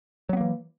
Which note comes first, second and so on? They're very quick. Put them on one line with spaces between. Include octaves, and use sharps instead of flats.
F#3 B3 A#3 E3